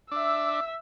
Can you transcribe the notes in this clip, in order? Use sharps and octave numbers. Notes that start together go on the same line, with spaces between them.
D4 E5 E6